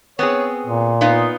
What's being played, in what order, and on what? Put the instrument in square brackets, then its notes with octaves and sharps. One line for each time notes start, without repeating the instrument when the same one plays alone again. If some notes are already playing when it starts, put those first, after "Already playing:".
[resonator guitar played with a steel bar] B3 C4 G#4 [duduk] C#5
[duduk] A#2
[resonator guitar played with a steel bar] B3 D#4 F4